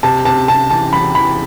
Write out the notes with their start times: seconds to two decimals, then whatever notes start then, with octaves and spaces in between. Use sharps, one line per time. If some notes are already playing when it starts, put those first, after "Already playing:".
0.03 C3 A5
0.25 C3 A5
0.48 C3 A5
0.70 E3 A5
0.93 E1 B5
1.15 E3 B5